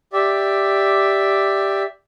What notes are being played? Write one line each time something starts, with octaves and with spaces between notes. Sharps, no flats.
G4 D5 E5